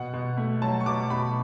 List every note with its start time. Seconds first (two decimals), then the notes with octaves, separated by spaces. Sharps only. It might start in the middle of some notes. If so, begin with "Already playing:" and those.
Already playing: B2 F#5
0.13 B2
0.37 A3
0.62 F#3 A5
0.80 C#6
0.86 B2 D6
1.10 B2 B5